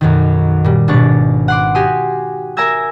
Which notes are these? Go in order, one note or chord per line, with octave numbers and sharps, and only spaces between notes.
B1 F#2 D#3
A#2 G3
G#1 B2 D4 C#6 A6
F#5 C6 D6
F#4 G4 G#5 C6 D#6
A#4 E5 G#5 A#5 E6 G#6